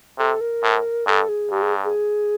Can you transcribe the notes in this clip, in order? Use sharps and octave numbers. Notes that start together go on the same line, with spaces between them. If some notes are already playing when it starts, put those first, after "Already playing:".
C3 A4
A#4
A2
G2 A4
G#4
G2 G4
G#4
G#4